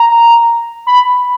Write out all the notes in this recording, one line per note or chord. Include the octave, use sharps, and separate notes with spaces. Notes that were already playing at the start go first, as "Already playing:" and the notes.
Already playing: A#5
B5